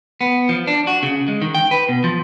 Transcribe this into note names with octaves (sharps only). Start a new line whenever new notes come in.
B3
F3
D4
F#4
C#3
G#3
D#3
G5
B4
B2
F3